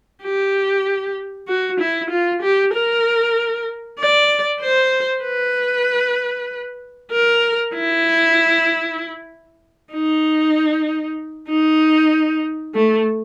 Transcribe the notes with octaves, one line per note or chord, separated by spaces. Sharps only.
G4
F#4
E4
F4
G4
A#4
D5
C5
B4
A#4
E4
D#4
D#4
A3